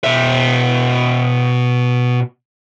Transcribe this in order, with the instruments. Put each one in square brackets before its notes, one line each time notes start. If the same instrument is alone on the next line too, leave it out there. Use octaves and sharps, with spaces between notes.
[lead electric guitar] B2 E5